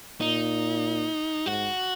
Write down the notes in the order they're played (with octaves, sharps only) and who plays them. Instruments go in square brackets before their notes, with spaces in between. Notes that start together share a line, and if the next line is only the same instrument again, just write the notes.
[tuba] A#2 [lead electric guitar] D#4
[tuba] G#2 [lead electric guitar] F#4